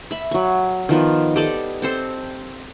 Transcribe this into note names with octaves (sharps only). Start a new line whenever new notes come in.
E5 B5
F#3 C#6
D#3 F3 B3
G4 A4 D5 D#5
C4 A4 C5